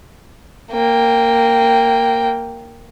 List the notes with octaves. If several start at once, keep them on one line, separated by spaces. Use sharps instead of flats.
A#3 G5